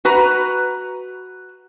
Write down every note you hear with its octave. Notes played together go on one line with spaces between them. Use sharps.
F#4 B4 A#5